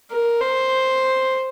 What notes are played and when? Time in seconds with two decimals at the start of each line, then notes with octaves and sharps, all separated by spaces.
0.11 A#4
0.41 C5